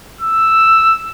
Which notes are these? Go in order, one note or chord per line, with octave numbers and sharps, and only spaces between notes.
E6